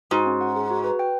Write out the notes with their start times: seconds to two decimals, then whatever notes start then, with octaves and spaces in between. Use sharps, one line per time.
0.11 G#2 F#4
0.26 C#4
0.41 F#5
0.56 G#4
0.70 F#4
0.84 B4
0.99 G5